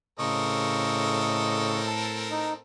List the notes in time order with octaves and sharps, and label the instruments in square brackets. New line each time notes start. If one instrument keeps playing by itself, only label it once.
[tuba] A2 [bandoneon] C#3 C#6 [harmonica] C4 A4 A#4 [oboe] D#5
[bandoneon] A5
D#4